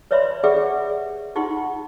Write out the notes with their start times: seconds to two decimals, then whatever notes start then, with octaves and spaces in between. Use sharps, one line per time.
0.11 B4 C#5 D5 E5 B5 C6
0.44 G4 G#4 B4 D5 E5 F#5
1.35 D#4 F4 G4 F#5 C6